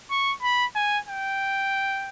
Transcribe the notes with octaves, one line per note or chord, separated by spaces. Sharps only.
C#6
B5
G#5
G5